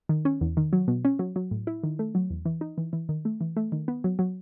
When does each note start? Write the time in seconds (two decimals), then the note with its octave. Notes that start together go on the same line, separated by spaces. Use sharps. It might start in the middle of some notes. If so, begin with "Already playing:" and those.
0.09 D#3
0.25 C#4
0.41 E2
0.57 D#3
0.73 F#3
0.88 B2
1.05 C#4
1.19 F#3
1.36 F#3
1.51 A2
1.67 E4
1.83 D#3
1.99 A3
2.15 F#3
2.30 E2
2.45 E3
2.61 D#4
2.78 E3
2.93 E3
3.09 D#3
3.25 A3
3.41 E3
3.57 A3
3.72 D#3
3.88 B3
4.04 F#3
4.19 F#3